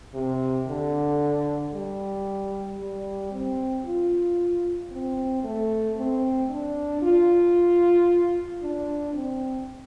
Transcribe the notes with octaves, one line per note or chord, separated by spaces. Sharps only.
C3
D3
G3
G3
C4
F4
C4
A3
C4
D4
F4
D4
C4